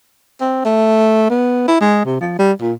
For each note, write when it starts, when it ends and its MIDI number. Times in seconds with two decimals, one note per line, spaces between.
0.41 0.62 60
0.64 1.28 57
1.30 1.63 59
1.68 1.76 64
1.81 2.01 56
2.05 2.20 48
2.21 2.34 53
2.39 2.52 55
2.61 2.74 46